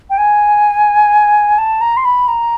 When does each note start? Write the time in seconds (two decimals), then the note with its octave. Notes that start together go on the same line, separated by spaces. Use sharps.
0.10 G5
0.18 G#5
1.58 A5
1.81 A#5
1.97 C6
2.05 B5
2.28 A#5